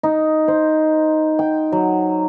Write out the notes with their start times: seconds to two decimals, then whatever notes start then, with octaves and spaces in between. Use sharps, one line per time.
0.03 D#4
0.48 C5
1.39 G5
1.72 F#3